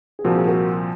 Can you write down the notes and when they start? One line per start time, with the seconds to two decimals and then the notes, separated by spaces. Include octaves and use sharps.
0.19 G#4
0.24 C2 A#2 F3 C4 F#4 A#4
0.37 G#4
0.47 F#4 A#4